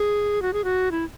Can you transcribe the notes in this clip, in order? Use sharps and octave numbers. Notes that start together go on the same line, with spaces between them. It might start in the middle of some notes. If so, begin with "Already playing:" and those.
Already playing: G#4
F#4
G#4
F#4
E4